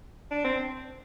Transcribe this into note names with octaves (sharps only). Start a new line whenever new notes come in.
D4
C4